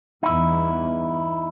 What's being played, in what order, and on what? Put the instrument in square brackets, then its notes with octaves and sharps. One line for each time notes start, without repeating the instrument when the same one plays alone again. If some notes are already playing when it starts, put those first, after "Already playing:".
[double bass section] E2 G2 [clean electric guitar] D#4 E4